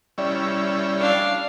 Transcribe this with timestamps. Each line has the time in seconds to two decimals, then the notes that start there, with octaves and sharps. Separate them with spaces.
0.18 G3 C#4 E4 D5
1.01 D4 F5